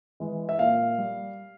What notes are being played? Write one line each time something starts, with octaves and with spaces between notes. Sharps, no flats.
E3 G#3
E5
A#2 F5
G3